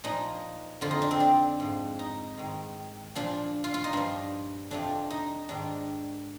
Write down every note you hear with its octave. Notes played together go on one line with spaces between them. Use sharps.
A#2 F3 D#4
F2 D3 F3 F4
D#4
D4
C4
D4
G#2 F3
D#4
G#2 D#3
A#2 F3 D4
F4
F4
D#4
G2 F3 D4
F2 C3 F3 D4
D#4
G#2 D#3 D4